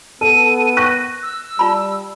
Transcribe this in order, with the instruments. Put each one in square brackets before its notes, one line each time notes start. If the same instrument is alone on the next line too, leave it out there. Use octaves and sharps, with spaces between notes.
[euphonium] B3 [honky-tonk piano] A4 [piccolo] D#7
[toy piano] C#6 [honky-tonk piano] F#6 A#6
[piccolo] E6
[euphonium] G3 [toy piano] F4 A5 B5